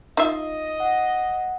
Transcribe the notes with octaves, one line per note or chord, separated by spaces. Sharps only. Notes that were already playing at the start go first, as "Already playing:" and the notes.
D#4 F4 D#5 E5
F#5